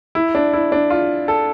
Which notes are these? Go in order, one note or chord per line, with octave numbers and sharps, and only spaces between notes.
E4
D4
E4
D4
F4
A4